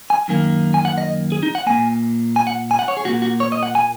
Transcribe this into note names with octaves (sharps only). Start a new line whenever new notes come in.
G#5
F#2 D#3 A#3
G#5
F#5
D#5
G#4
D#4
F#5
A#2 A#3 G#5
G#5
F#5
G#5
F#5
C#5
G#4
A#2 A#3 F#4
F#4
C#5
D#5
F#5
G#5